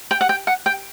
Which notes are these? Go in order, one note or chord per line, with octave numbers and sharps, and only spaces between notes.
G5
F#5
G5
F#5
G5